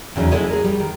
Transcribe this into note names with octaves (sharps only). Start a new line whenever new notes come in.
E2 C#3 F3 F#3 D#4
G#3 B3 E4 A4 C#5 D#5
G#4 A#4
G3
D#3